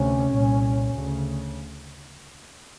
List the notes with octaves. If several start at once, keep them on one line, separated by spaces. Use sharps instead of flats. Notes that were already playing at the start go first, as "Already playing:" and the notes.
Already playing: D2 C3 C#4
C2 A#2
D2 C#3